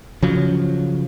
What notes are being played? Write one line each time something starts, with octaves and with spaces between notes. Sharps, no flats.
C#3 F3 F#3